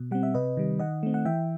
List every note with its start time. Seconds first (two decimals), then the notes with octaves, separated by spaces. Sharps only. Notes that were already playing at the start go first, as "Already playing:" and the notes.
Already playing: B2
0.11 G3 C4 F#5
0.23 E5
0.34 C3 B4 D#5
0.57 D#3 G3
0.79 D#3 D#5 F#5
1.03 A3 C4
1.14 F#5
1.25 E3 E5 G5